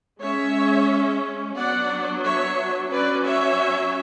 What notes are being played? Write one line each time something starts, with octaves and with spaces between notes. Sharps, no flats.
G#3 C#4 C#5 E5
F#3 B3 D4 D5 F#5
C#5 E5
F#3 C#4 B4 D5
C#5 E5